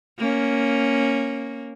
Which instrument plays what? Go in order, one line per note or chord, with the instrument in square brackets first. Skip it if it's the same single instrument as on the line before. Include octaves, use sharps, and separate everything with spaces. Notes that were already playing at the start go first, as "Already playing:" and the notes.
[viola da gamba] A#3 C#4